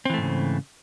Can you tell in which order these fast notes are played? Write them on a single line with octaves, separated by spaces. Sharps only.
C4 E3 A3 G#2 C#3